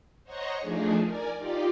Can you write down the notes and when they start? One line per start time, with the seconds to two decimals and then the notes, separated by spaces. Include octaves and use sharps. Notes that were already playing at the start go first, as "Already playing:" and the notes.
0.23 C5 C#5 D#5 F#5 A#5 C#6
0.58 F3 A3 D4 D#4 G#4
1.02 A#4 D5 G#5
1.37 D#4 F4 G4 D5